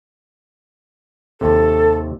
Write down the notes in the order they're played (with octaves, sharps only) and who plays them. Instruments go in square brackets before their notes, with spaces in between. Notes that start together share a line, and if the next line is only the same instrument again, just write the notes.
[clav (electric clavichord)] D#2 C3 [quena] A4